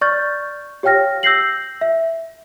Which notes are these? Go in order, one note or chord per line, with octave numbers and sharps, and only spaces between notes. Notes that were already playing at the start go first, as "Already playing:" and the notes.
D5 C#6 F6 G6 A6
G4 C#5 F5 G5 F6 A#6
E6 G6 A#6 C7 F#7
E5